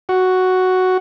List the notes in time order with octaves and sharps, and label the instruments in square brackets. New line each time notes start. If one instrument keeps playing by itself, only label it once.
[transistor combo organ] F#4